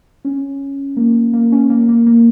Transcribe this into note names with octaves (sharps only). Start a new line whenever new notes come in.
C#4
A#3
A#3
C#4
A#3
A#3
A#3